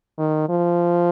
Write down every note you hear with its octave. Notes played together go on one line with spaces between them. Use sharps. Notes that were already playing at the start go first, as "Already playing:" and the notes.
D#3
F3